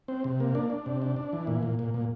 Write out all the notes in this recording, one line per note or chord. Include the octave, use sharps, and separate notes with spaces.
C4
C3
A#3
D4
D4
C3
D4
D4
E3
A#2
A#2
A#2
A#2